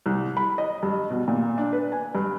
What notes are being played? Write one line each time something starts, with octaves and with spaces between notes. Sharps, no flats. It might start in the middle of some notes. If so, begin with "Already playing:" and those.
C2
B5
D#5
G2
B2
A#2
D4
B4
G#5
G2